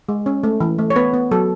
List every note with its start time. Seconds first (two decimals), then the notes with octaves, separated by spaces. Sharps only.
0.09 G#3
0.26 C#4
0.44 A3
0.60 E3
0.78 A3
0.90 C#5
0.96 B3 B4
1.14 B3
1.31 F#3 A4